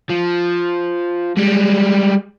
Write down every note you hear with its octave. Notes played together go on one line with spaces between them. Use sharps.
F3
G3 G#3